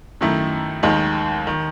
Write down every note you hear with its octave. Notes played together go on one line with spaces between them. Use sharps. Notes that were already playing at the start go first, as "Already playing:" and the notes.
F#2 D#3 A3 E4
D#2 D#3 G#3 D#4
D#3